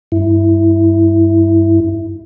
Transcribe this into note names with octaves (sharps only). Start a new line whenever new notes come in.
G2 E4